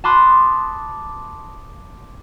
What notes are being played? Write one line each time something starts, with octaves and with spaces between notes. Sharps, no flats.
A5 B5 C6 D6 D#6 F#6